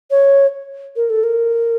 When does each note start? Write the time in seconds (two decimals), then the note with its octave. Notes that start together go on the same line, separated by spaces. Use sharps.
0.11 C#5
0.96 A#4
1.10 A4
1.24 A#4